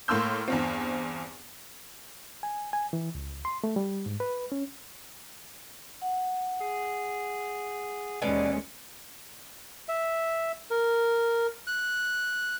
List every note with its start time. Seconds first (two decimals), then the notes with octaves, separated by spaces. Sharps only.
0.08 A2 A#3 C6 E6 G6
0.48 E2 G2 C4
2.43 G#5
2.73 G#5
2.93 E3
3.15 C#2
3.45 C6
3.64 A3
3.76 G3
4.06 G#2
4.20 B4
4.52 C#4
6.02 F#5
6.61 G#4
8.22 D#2 B2 E3 G#3 C#4 D5 G#5
9.88 E5
10.70 A#4
11.67 F#6